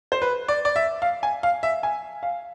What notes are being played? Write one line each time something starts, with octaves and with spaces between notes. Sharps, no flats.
C5
B4
D5
D5
E5
F5
G#5
F5
E5
G#5
F5